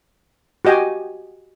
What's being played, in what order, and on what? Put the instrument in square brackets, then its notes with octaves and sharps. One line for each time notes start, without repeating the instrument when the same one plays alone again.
[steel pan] F#4 G4 D#5 G5 G#5